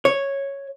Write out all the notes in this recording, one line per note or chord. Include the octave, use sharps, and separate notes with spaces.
C#5